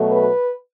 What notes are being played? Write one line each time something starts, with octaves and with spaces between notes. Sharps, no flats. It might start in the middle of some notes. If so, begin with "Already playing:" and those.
Already playing: B2 F#3 A3
B4